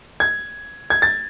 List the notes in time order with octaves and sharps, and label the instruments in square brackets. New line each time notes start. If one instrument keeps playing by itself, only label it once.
[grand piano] G#6
G#6
A6